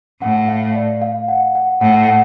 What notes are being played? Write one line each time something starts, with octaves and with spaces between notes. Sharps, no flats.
A2 F#5
F5
D5
F5
F#5
F#5
A2 F#5
F#5